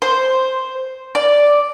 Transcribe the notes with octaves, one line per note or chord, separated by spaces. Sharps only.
C5
D5